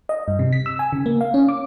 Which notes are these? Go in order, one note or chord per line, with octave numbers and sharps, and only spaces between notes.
D#5
G2
C3
B6
E6
G#5
C#3
A#3
F5
C#4
D6